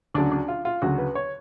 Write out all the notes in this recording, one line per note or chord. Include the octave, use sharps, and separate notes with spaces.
D2 C#3 F#3 D4
D4
F4
F4
D2 C#3 F#3 F#4
B4
C#5